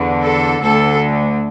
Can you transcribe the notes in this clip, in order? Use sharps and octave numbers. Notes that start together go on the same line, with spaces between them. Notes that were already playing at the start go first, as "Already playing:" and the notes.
Already playing: E2 D3
A4
D2 D3 A4